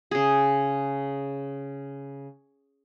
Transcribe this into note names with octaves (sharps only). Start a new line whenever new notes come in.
C#3 G#4